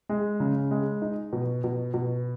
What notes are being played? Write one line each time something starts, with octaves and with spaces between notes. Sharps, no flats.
G#3
C#3
G#3
D#4
B2
B2
B2